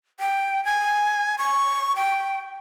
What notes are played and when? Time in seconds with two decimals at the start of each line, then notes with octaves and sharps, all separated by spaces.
0.20 G5
0.65 G#5
1.38 C#6
1.96 G5